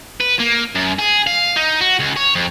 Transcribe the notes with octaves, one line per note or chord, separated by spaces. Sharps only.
B4
A#3
F#2
G#4
F5
D#4
F#4
C#2
C#5
F2